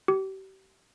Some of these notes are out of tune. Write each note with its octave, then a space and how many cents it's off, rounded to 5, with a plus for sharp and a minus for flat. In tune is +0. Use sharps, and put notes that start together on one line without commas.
G4 -35